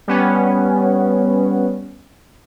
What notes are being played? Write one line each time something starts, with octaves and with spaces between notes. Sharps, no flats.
G3 B3 C#4